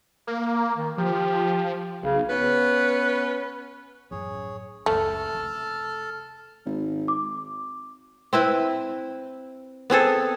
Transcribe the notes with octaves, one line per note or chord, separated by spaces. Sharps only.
A#3
D#3
F3 G4
B1 C#3
B3 C#4 B4
A1 F#2 G#4 C#5
F#1 C#2 A3 A4 A5 F6
F1
G#1
D6
C4 E4 B4
B3 C4 G#4 A4